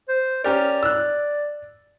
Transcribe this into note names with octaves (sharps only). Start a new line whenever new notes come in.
C5
C#4 G4 A#4 D5
E6 F#6